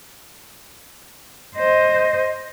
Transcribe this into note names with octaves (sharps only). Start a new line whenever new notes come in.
C5 D#5